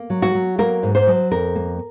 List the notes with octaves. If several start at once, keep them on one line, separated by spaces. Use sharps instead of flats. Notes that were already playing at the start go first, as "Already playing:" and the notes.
Already playing: A#3
F#3
F#4
F#3
A#3 A#4
G#2
C5
F#3
F2 A#4
A#3